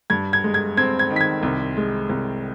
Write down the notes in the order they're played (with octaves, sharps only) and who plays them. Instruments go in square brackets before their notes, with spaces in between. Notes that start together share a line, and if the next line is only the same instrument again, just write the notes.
[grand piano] G2 G#6
G#6
G#3
G#6
C4 G#6
G#6
D#3
B6
G#6
C2
G#3
C2